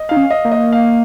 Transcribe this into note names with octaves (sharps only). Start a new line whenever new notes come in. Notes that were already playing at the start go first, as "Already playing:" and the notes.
Already playing: D#5
D#4 F5
C#4
D#5
A#3
D#5
F5